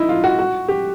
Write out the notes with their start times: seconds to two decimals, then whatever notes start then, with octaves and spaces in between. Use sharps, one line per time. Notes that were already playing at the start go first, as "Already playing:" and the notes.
Already playing: D#4 E4
0.09 F4
0.24 F#4
0.39 F#4
0.68 G4